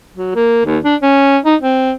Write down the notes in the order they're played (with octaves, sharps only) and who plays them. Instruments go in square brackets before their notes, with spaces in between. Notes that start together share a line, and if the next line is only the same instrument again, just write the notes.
[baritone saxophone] F#3
A#3
D#2
D4
C#4
D#4
C4